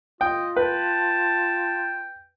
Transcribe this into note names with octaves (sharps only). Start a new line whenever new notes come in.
F4 D#5 G5
B4 G5 A5